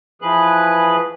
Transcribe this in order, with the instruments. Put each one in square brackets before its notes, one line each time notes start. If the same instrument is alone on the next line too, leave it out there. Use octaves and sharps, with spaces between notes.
[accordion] E3 F3 G#4 B4 F#6